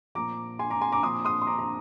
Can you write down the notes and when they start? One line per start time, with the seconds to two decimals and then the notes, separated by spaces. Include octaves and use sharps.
0.15 A#2 F3 A#5 D6
0.59 G#5 C6
0.70 A#5 D6
0.81 G#5 C6
0.92 A#5 D6
1.03 A#2 F3 C6 D#6
1.25 C6 D#6
1.42 C6
1.47 A#5 D6
1.59 A#5